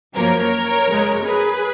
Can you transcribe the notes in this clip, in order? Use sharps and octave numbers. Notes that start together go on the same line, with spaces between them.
F#2 F3 A#3 A#4 C#5
F#2 C#3 G#3
G#4 B4